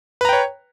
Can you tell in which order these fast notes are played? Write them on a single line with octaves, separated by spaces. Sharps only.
B4 A#5 G5 C#5